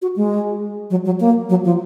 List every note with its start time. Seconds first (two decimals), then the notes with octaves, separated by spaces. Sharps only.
0.02 F#4
0.16 G#3
0.90 F#3
1.05 F#3
1.20 A#3
1.50 F#3
1.65 F3